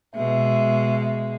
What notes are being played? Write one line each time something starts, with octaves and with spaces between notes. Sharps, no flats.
B2 G#3 E5